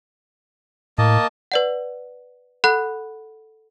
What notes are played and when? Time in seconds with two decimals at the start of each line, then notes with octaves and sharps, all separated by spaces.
0.98 A2 A#3 D#5 A5
1.52 B4 D5 F#5
2.64 A4 F#5 B5 F#6